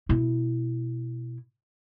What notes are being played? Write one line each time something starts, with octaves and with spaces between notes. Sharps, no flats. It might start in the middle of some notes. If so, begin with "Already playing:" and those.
B2 E4